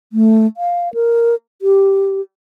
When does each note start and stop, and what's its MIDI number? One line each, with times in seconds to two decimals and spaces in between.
0.13 0.46 57
0.57 0.92 77
0.94 1.35 70
1.62 2.21 67